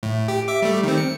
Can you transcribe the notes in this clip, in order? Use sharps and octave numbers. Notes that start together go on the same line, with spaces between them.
A2
G4
E5 D6
G3 A3
D#3 C4
C#7